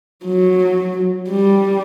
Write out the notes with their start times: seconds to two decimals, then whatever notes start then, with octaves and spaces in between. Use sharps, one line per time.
0.25 F#3
1.29 G3